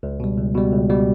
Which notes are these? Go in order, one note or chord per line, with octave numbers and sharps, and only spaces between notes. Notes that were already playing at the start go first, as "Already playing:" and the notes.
C#2
B2 G3
C#2
B2 G3
C#2
B2 G3